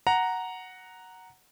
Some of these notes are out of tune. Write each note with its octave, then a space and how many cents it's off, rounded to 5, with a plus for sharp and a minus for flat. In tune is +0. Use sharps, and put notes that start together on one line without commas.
F#5 +0 A#5 +0